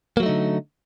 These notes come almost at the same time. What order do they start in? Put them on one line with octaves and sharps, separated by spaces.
A#3 F#3 A3 D#4 D3